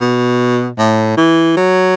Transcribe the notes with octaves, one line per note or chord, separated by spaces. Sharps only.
B2
A2
E3
F#3